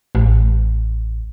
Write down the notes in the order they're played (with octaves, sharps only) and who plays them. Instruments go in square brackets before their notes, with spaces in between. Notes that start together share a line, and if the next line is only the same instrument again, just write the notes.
[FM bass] A1